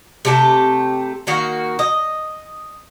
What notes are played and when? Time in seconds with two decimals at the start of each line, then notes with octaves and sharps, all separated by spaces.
0.25 C3 A3 G4
1.27 D#3 A#3 F#4
1.79 D#5